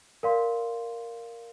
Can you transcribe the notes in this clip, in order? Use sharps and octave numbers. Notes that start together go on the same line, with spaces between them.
A#4 D5 F5 C6